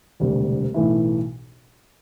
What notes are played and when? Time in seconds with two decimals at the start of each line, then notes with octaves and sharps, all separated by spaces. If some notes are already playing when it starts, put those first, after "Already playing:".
0.20 E1 D2 C3 G3
0.74 B1 A2 E3 A3 E4